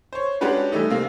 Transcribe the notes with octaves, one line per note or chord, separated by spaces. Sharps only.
C5 C#5
G#3 C#4 D4 F#4 G4 B4
E3 G3 A3 D#4
C3 A#3 C4